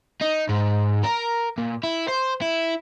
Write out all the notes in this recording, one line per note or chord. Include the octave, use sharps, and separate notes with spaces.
D#4
G#2
A#4
A#2
E4
C5
E4